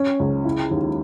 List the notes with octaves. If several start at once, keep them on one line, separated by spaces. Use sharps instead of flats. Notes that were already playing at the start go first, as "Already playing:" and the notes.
Already playing: C#4
C#2
E4
D#2